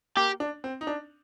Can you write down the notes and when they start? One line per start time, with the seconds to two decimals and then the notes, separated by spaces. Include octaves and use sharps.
0.17 A#3 G4
0.40 D4
0.64 C4
0.81 D#4
0.87 D4